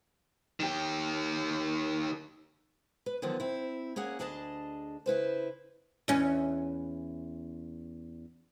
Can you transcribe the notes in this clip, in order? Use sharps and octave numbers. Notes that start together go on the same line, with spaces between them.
D#3 G4
B4
D3 D#3 F3 F#3 B3
C4 E4
A#3 C#4 G#4 F#5
D2 D4 G#4 D#5 E5 A5
C#3 E4 B4 C5
E2 C#4